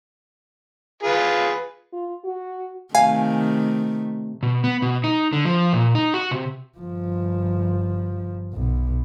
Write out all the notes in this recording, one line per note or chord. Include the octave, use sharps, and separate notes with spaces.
F4 G#4 B4
F4
F#4
C3 D#3 A3 F5 G#5
B2
B3
B2
D#4
D3
F3
A#2
D#4
F#4
C3
G1 F3
B1 B2